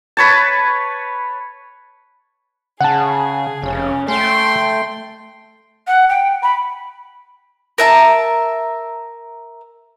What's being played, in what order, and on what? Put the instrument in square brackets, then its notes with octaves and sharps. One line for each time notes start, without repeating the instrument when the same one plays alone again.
[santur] B4 C#5 A5
[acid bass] C#3 [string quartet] G#4 [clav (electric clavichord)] F#5 A5
[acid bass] F1 [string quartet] C#3 C#4
[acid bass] A3 [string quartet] G5 C6
[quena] F#5
G5
B5
[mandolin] A#4 E5 A5